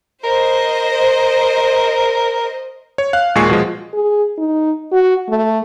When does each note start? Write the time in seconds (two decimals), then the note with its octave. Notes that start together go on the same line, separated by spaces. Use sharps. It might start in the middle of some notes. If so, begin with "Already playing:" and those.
0.24 A#4 C5 D#5
2.98 C#5
3.13 F5 F#6
3.35 D#2 A#2 G#3 G#5 C#6 C7
3.49 B2 F3 G#3
3.93 G#4
4.38 D#4
4.92 F#4
5.29 A3